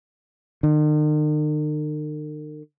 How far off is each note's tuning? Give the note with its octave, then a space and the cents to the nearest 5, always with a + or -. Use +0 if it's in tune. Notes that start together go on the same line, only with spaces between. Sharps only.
D#3 -45